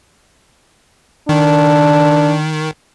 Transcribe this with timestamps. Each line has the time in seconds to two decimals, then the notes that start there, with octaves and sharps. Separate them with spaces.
1.29 D#3 D4